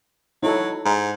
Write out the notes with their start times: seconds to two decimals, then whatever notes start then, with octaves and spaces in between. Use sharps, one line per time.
0.43 F#3 D#4 E4 A4
0.85 G#2